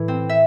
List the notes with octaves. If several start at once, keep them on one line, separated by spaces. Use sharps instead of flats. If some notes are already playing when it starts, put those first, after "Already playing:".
Already playing: A2 E3
C4
E5